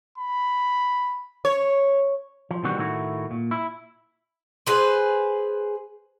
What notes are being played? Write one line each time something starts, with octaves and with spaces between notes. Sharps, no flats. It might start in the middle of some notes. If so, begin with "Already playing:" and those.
B5
C#5
F3
B2 D#3 E3 G3 C4 F#4
A2 D#3 A3 E4 F#4
A#2
E4
G#4 B4 C5